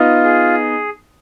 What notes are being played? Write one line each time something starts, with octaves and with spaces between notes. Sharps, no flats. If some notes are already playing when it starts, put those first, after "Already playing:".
Already playing: B3 D#4 F4
G#4